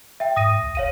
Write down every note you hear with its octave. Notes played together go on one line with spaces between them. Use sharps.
E5 G5
G#2 D#6 A#6 D#7
C#2
F1 C#5 F5 D#7